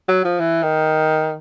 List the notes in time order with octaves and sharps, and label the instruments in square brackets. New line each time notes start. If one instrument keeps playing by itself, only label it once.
[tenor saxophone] F#3
F3
E3
D#3